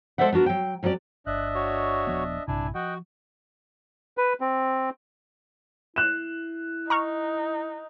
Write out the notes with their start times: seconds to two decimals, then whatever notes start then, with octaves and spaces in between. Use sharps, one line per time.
0.18 G#3 A4 C5 D5 E5 F#5
0.33 B3 D4 F#4 A#4
0.46 F#3 G5
0.83 F2 F#3 C#4 F#4 D5
1.27 G1 D4 D#5 E5 F#6
1.55 F#4 C#5
2.07 D#1 F3 B3
2.48 A#1 G2 C3 D4 E4 G#5
2.75 F3 F#4 D#5 F#5 G5
4.18 B4
4.41 C4
5.96 E4 F#6 E7
6.90 D#4 A#5 C#6 F6